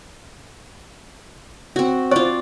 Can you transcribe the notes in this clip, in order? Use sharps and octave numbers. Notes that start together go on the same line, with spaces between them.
C4 F#4
F4 C5 D5 C#6